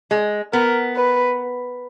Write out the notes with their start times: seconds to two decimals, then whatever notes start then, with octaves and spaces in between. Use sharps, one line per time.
0.11 G#3
0.53 B3 A#4
0.96 B4